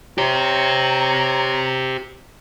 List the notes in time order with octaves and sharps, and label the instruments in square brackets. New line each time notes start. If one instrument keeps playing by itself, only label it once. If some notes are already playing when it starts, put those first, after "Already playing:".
[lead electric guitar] G4 C5 [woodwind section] C#5 A#5